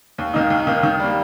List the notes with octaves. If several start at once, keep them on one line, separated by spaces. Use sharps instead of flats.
D#2
D#3 A#3 D#4
D#2
D#3 A#3 D#4
D#3
G3 A#3